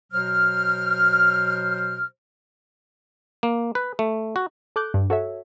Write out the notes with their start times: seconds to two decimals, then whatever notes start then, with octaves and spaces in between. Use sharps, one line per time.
0.12 B2 F#3 C5 F6
3.43 A#3
3.75 B4
3.99 A3
4.36 F#4
4.76 A4 D6 F#6 G6
4.94 G2
5.10 F#4 A4 C#5 E5